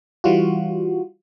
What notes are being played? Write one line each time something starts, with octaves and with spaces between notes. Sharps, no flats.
E3 G3 F4 F#4